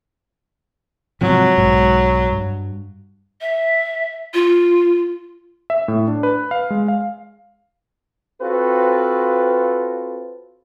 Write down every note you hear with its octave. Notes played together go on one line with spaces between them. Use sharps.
G#2 C3 F3 F#3
B1 G#2
G2
E5
F4
E5
A2
D4
B4
F5
G#3
F5
C4 F4 F#4 A4 B4